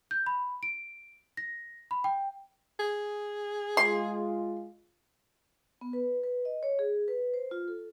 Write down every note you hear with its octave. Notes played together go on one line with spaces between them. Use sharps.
G6
B5
D7
A#6
B5
G5
G#4
G#3 F4 C6
B3
B4
B4
D#5
C#5
G#4
B4
C5
F4
A4